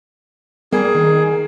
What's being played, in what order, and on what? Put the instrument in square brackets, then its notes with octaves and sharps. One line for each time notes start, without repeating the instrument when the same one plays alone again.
[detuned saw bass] G3 [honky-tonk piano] A#3 [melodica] G#4
[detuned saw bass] D#3